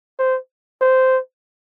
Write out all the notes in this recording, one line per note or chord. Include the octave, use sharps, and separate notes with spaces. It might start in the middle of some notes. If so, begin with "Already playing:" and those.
C5
C5